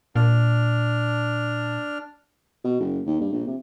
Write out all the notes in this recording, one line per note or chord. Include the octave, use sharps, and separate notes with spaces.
A#2 D4 F6
B2
F#1
D#2
G2
A#1
C3